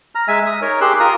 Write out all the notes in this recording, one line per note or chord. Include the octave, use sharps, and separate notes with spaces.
A#5 F6
G#3 E5 G#5
D#6
D#4 A#4 C#5
G4 G#4 C6 E6 F#6
F4 A#4 A#5 D#6